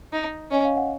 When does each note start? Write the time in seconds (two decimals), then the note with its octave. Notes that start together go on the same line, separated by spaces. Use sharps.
0.13 D#4
0.51 C#4 D#5
0.65 F5
0.77 F#5